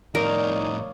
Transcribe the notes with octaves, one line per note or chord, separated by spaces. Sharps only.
F2 A2 D#4 A#4 C#5 D5 F5